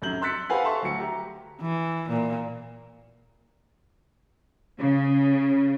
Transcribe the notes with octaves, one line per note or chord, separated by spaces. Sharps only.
F1 F#2 F#3 G6 F#7
C6 E6 F#6 A6 B6 C#7
G4 B4 C5 F5 F#5 G#5
A4 E5 A5 C6 C#6 E6
D2 F#3 F#4 C#7
G4 A#5
E3
A#2
C#3